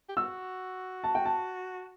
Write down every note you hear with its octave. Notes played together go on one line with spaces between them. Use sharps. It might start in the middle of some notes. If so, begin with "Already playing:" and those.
G4
F#4 E6
A5
G5
A5